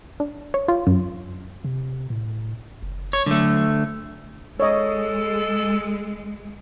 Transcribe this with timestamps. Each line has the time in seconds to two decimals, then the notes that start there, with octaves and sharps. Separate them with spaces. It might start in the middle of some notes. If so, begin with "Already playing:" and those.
0.20 D4
0.54 C#5
0.68 F4
0.87 F#2
1.64 C3
2.10 A2
2.83 F#1
3.13 C#5
3.26 D3 F#3 A3
4.60 G#3 A4 C#5 D#5